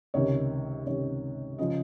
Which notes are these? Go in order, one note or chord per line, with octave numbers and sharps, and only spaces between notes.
C#2 C3 D#3 C#5
C#2 C3 D#3 C#5
C#3 F3 D#5